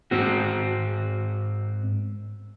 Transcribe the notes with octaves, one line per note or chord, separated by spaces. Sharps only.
G#2 C4 F#4